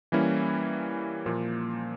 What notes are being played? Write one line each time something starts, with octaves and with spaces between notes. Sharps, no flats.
E3 G3 A#3 C#4 E4
A#2 F3 A#3